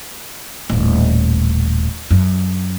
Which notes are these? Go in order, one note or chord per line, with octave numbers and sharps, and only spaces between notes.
D#1 A1
F#2